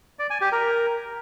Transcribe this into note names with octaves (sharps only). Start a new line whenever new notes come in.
D5
G#5
G4
A#4